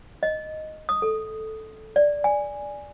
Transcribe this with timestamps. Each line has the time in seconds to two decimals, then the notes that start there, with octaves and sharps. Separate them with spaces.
0.23 D#5
0.89 D#6
1.02 A4
1.96 D5
2.24 G#5